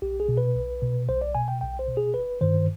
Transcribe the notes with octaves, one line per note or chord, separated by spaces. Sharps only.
B1 G4
G#4
B2
B4
B1
B2
B1 C5
D5
B2 G#5
G5
B1 G5
C5
B2
G#4
G1 B4
G2 D#3 C5